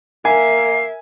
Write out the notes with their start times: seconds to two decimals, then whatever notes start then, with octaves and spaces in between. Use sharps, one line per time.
0.25 A#3 A#4 E5 G#5 C7